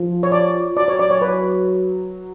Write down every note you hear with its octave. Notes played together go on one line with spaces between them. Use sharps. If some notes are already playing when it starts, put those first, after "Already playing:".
Already playing: F3
C#5
D5
F#3 D5
C#5
D5
C#5
B4